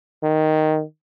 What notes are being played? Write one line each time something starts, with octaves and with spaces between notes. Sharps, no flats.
D#3